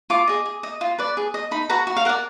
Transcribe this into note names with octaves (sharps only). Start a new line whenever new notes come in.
F4 D6
G#4 D#5
G#4
D#5
F4
B4 D5
G#4
D#5
D#4 B5
F#4 B4 A#5
F#4
F5
A#4 D5 F#5